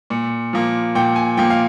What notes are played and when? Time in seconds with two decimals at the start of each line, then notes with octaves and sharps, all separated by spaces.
0.10 A#2
0.53 F3 A#3
0.95 A#2 G5
1.16 G#5
1.37 F3 A#3 G5
1.50 F5